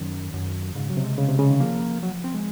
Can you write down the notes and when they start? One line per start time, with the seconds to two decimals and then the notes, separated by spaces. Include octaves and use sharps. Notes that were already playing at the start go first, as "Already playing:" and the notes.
Already playing: F#2 D#3
0.34 F#2
0.75 G#2 C#3
0.90 F#3
0.97 C3
1.04 G#3
1.18 C#3
1.29 C3
1.39 C#3
1.50 D#3
1.60 F3 A#3
2.03 F#3
2.24 C4
2.34 G#3